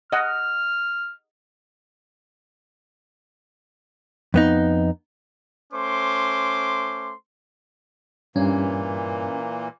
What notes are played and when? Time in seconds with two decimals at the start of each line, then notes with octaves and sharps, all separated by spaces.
0.12 D#5 F#5 F6
4.34 F2 B3 D#4
5.73 A3 C#4 C5 C6 D6
8.36 G2 A#2 E3 A#3 C#4